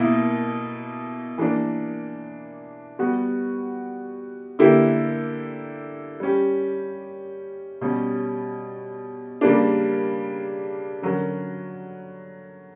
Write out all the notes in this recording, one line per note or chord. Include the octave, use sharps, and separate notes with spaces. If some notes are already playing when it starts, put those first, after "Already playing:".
Already playing: B2 A#3 E4
E3 A#3 D4
G3 B3 F#4
D3 A#3 E4 G4
G3 C#4 G4
B2 G3 C#4
C#3 G3 A#3 D4
D3 F#3 C#4 F#4 A#4